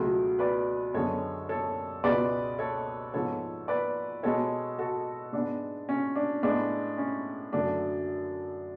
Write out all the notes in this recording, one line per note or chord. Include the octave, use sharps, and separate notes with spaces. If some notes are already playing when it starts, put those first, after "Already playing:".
Already playing: C#2 B2 F#3 A3
B4 D5
F#2 D3 G#3 B3 A4 C#5
A4 C#5
C#2 B2 G#3 B3 B4 D5
A4 C#5
G#2 F3 B3 A4 C#5
B4 D5
B2 G#3 B3 A4 C#5
F#4 A4
G#2 G#3 B3 D4
C#4
D4
A2 G#3 B3 D4
C#4
F#2 D3 F#3 A3 D4